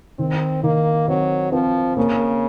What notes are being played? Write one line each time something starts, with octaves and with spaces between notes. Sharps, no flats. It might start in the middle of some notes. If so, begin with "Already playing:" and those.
D#3 C4
D#3 A#3
F#3 C4
F3 C4
C#3 A#3